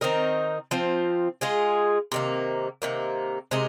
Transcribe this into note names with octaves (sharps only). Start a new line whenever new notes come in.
D#3 C4 D#4 A#4
F3 C4 F4
G#3 F4 G#4
C3 D#3 A#3
C3 D#3 A#3
C3 G#3 D#4 A#4